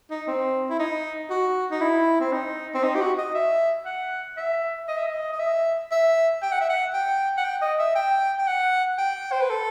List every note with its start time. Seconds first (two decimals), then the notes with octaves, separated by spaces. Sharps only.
0.11 D#4
0.27 C4
0.70 E4
0.79 D#4
1.30 F#4
1.71 D#4
1.81 E4
2.20 C4
2.32 D#4
2.74 C4
2.83 D#4
2.95 G4
3.00 F#4
3.18 D#5
3.34 E5
3.86 F#5
4.37 E5
4.88 D#5
4.97 E5
5.06 D#5
5.32 D#5
5.40 E5
5.91 E5
6.42 G5
6.52 F#5
6.61 E5
6.69 F#5
6.93 G5
7.37 F#5
7.44 G5
7.61 D#5
7.79 E5
7.95 G5
8.39 G5
8.47 F#5
8.98 G5
9.32 C5
9.41 B4
9.49 A4